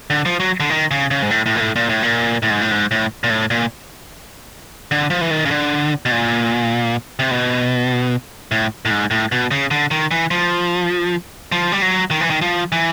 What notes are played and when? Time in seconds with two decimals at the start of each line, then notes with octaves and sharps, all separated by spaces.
0.10 D3
0.26 F3
0.40 F#3
0.60 D3
0.70 D#3
0.91 C#3
1.11 C#3
1.22 G#2
1.31 A2
1.46 A2
1.56 A#2
1.60 A2
1.76 A#2
1.89 A2
2.02 A#2
2.43 A2
2.50 G#2
2.61 A2
2.71 G#2
2.91 A2
3.24 A#2
3.31 A2
3.51 A#2
4.91 D3
5.10 F3
5.21 E3
5.31 D#3
5.46 C#3
5.51 D3
6.05 B2
6.11 A#2
7.19 C3
7.31 B2
8.51 A2
8.85 A2
8.91 G#2
9.11 A2
9.32 B2
9.51 C#3
9.71 D3
9.91 D#3
10.11 E3
10.31 F3
11.52 F3
11.72 G3
11.82 F#3
12.11 D#3
12.21 E3
12.30 D#3
12.41 F3
12.72 E3